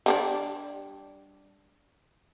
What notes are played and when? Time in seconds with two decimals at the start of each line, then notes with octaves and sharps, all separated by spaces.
0.06 G3 D4 D5